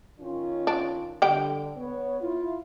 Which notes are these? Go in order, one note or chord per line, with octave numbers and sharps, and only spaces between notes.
D#3 C#4 F4
D4
D3 G3 G5
B3 C#5
E4 F4